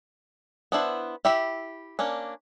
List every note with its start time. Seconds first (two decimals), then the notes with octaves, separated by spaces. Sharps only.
0.72 B3 D4 E4 C5
1.25 E4 G4 E5 B5
1.99 A#3 C#4 D4